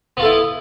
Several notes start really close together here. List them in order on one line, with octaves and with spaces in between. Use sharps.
B3 F4 A4 E4